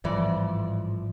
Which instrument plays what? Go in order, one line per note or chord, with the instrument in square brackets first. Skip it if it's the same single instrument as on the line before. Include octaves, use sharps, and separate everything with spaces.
[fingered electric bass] A1 G#2 G3 [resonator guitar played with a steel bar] F2 E3 D5 [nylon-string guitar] F3